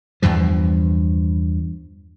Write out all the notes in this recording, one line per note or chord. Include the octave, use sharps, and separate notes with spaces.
E2 G2 E3 F3